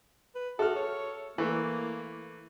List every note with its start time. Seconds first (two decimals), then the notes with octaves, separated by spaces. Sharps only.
0.35 B4
0.59 F#4 G#4 A4 E5 F6
0.76 C#5
1.38 E3 A3 A#3 E4 A#4 B4